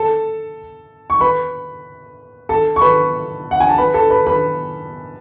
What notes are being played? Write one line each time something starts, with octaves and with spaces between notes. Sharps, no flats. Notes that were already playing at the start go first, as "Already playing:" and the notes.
Already playing: A4 A5
C#6
B4 B5
A4 A5
C#6
B4 B5
F#5
G#5
A5
B4 B5
A4 A5
B4 B5
B4 B5